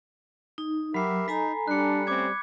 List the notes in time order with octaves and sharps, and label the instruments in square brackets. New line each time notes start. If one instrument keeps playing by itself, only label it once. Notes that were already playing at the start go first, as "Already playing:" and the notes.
[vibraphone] D#4
[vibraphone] F#3 [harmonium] G4 A#4 E5 [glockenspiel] B5 C7
[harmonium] D#4 [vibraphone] A4 G#5 A#5 [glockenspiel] B6
[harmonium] G3 [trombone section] D4 [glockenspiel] F#6 C#7
[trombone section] A3 C4 C#4 [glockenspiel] D6 G#6